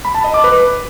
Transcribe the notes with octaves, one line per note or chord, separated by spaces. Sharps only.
B5
A5
D#5
D6
B4